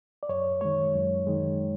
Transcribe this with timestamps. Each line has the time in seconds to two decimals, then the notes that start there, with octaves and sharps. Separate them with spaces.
0.23 D5
0.29 F#2 C#5
0.61 D#3 G#3 C#5
0.95 F#2
1.27 D#3 G#3